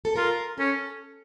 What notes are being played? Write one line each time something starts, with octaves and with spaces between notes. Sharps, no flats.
A4
F4 A#4
C#4 A4